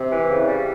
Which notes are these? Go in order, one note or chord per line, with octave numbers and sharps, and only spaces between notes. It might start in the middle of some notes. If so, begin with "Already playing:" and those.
Already playing: C3
E3
C#3
G3